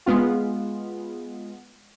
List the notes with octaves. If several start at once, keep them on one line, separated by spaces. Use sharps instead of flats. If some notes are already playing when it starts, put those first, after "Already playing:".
G#3 B3 F4